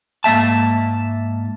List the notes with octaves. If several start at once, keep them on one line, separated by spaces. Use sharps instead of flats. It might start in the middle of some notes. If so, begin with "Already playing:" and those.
G#2 A#3 E5 A5